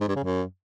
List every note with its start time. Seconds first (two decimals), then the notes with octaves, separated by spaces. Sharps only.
0.01 G#2
0.08 G2
0.16 C#3
0.24 F#2